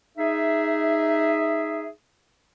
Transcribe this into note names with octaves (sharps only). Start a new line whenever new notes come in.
D#4 G#4 E5